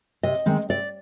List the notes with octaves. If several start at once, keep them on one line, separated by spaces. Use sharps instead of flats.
C3 D#5
D#3 G#3 C4
C3 D5